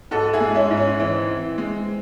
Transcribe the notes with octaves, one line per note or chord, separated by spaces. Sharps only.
G#2 F#4 A4
E4 G#4
G#3
C#4 E4
G#2
C#4
E3 C4
E3
G#3